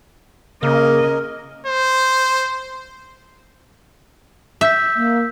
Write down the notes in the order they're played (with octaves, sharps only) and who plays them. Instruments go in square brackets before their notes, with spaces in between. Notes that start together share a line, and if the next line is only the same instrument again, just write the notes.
[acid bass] C#3 [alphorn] A#3 [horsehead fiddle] C#4 D#5 [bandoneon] A#4
[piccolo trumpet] C5
[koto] E5 [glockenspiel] E6 G6 B6
[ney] A#3